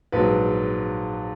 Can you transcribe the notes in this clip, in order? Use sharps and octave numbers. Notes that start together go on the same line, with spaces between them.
A#1 G#2 F#3 B4